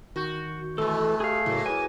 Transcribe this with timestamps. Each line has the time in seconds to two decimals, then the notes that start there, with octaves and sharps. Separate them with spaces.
0.16 D#3 F#4 C#6 G6
0.78 B2 E3 G#3 A3 A4
1.20 G4 G#4 F5
1.46 A2 C#3 F#3 A#3 E4
1.66 E4 G#4 B4 G#5